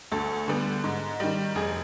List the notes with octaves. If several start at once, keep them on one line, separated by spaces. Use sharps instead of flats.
D2 A4
D3 G3 B3
G#2
D#3 G3
F1 G#4